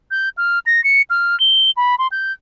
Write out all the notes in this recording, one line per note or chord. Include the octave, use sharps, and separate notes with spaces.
G6
F6
A#6
C#7
F6
G7
B5
C6
G6